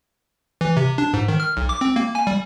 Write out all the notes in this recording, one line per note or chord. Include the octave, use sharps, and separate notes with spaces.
E3
C3
D4
G#2
D#3
F6
B1
D6
C4
A#3
G#5
G3